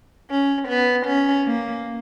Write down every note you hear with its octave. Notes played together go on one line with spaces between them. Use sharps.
C#4
B3
C#4
A#3